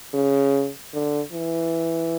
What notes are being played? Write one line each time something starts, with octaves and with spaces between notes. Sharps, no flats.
C#3
D3
E3